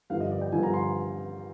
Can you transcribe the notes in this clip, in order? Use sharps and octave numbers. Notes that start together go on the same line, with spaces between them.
G2 D3 F3 F5
D#5
D5
G5
G2 D3 F3 G#5
A#5
C6